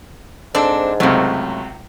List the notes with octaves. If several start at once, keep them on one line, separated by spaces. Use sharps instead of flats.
G#2 C4 D4 A4
C#2 F#2 C3 F#3 A3